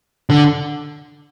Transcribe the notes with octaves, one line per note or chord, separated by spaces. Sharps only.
D3